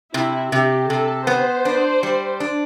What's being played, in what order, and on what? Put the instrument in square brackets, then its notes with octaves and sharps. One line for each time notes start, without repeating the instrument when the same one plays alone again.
[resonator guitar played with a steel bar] C3 [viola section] E4
[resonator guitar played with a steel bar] C3 [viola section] G4
[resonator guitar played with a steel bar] C3 [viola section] A4
[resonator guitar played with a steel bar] B3 [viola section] C5
[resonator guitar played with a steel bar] D4
G3
D4